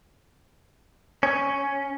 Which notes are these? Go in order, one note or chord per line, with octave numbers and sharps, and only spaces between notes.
C#4